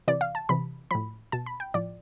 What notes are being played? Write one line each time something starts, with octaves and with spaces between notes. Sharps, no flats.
C3 E3 D5
F5
A5
C3 E3 B5
A2 F3 B5
B2 A5
B5
G5
A2 F3 D5